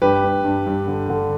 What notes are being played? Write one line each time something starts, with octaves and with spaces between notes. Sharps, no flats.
G2 G4 B4
G2
G2
G2
D3
D3